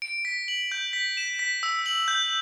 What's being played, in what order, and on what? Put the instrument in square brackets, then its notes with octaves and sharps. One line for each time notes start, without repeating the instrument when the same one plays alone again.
[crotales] D7
B6
F#7
G6
B6
E7
B6
E6
F#7
G6